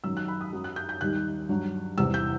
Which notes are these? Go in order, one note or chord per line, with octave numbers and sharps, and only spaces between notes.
F#2 D#3 F#3 E6
F#6
B5
D#6
F#2 F#3
F#6
G6
G6
D#2 D#3 G3 F#6
G2 F#3
E2 C3 E3 G3 E6
G6